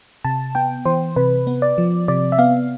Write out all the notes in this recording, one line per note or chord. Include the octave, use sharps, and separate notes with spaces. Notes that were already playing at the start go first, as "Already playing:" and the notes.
C3 A5
B3 G5
E3 C5
C3 B4
B3
D5
F3
C3 D5
E5
B3 F5